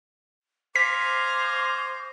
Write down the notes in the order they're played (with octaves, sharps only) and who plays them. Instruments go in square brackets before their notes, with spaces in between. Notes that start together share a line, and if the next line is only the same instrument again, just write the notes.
[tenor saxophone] C5 [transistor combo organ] F5 G#5 A#5 [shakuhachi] D6 [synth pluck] B6